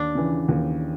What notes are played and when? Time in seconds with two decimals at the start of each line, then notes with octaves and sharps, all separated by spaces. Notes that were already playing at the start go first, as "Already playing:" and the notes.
Already playing: D#2 D4
0.15 C#3 E3
0.49 D#2